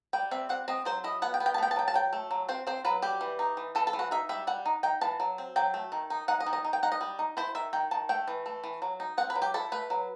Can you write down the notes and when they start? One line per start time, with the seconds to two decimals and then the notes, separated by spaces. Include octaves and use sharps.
0.13 G3 G5
0.31 C4 E5
0.49 C4 F#5
0.68 C4 D#5
0.85 F#3 C5
1.04 E4 D#5
1.22 B3 F#5
1.34 G5
1.40 B3
1.46 G5
1.54 A5
1.58 A3 G5
1.71 A5
1.76 F#3 G5
1.88 A5
1.94 F#3 G5
2.13 A3
2.31 F#3
2.49 C4 C5
2.67 C4 C5
2.85 F#3 B4
3.02 G3 G4
3.21 E3
3.39 D#4
3.57 E3
3.75 E3 A4
3.87 A4
3.93 E3
3.99 F#4
4.11 D#4 E5
4.29 G3 E5
4.47 G3 F#5
4.66 D#4
4.83 D#4 G5
5.01 E3 A5
5.20 F#3
5.38 C4
5.56 F#3 G5
5.74 A3
5.92 D#3
6.10 D#4
6.28 D#4 F#5
6.40 D#5
6.46 D#3
6.53 D#5
6.65 D#4
6.73 G5
6.83 D#4 F#5
6.92 D#5
7.01 G3
7.19 D#4
7.37 E4 C5
7.55 D#3 E5
7.73 D#3 G5
7.91 D#3 A5
8.09 A3 G5
8.28 E3
8.46 A3
8.64 E3
8.82 F#3
9.00 D#4
9.18 C4 F#5
9.30 B4
9.35 F#3
9.42 G4
9.54 E4 A4
9.72 A3 B4
9.90 F#3